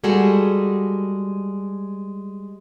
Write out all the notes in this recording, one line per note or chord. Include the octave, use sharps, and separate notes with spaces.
G3 G#3 F#4 G#4 A4